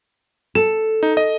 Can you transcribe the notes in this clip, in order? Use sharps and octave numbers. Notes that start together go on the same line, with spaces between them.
A4 E7
D#4
D#5